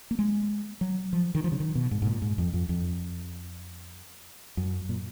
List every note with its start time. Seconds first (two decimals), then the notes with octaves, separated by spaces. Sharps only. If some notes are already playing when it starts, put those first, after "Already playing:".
0.11 A#3
0.19 G#3
0.81 F#3
1.13 F3
1.35 D#3
1.44 F3
1.52 C#3
1.60 D#3
1.75 B2
1.91 G#2
2.02 G#2
2.06 A#2
2.22 G#2
2.38 F2
2.53 F2
2.69 F2
4.57 F#2
4.89 A#2